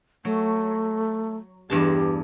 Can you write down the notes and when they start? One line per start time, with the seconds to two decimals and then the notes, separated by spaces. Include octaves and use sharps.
0.25 F#3 A3
1.70 E2 G2 G4 A5